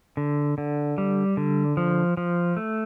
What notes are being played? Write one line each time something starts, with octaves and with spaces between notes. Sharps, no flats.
D3
D3
G3
D3
F3
F3
A3